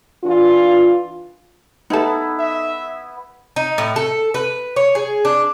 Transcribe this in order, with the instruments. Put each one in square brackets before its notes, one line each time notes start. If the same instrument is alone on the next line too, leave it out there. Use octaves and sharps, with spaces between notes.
[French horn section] E3 D4 F4
[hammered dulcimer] B3 E4 [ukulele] D#4 A4
[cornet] E5
[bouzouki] D#4
A2
A4
B4
C#5
G#4
D4